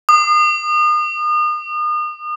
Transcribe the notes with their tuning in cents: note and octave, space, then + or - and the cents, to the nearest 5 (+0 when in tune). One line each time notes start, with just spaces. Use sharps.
D#6 -40